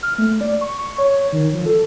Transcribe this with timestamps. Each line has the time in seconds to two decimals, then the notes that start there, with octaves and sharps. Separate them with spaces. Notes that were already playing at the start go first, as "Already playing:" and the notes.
0.03 F6
0.18 A3
0.41 D5
0.61 C#6
0.78 C#6
0.98 C#5
1.33 D#3
1.54 F3
1.66 A4